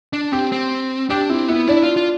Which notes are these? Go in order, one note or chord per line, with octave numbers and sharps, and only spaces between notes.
D4
C4 G4
C4
D4 G4
C4 E4
B3 E4
D4 E4
F4
F4